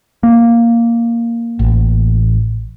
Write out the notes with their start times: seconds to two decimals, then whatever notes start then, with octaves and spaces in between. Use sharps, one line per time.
0.23 A#3
1.59 A1